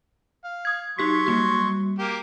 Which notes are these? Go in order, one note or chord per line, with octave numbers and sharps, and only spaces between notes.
F5
D#6 G#6
F#3 D#4 G4 C6 C#6 B6
G3 A#3 F#4
A#3 G4